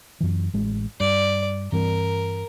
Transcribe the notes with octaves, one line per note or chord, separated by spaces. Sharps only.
F#2 E3
A1 G#3
G2 D5
G2 E3 C4 A#4